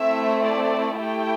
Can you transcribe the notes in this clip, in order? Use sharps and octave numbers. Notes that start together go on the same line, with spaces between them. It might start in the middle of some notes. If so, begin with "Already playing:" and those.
Already playing: A3 C4 E4 E5
D5
A3 E4 G4 G5